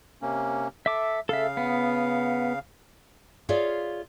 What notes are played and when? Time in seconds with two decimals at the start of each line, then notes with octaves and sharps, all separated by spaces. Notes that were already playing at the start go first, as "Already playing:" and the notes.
0.22 C3 A#3 C#4
0.86 A4 E5 D6
1.29 C#3 A4 E5 F5
1.57 B3
3.49 F4 G#4 C#5 D5 E5 F5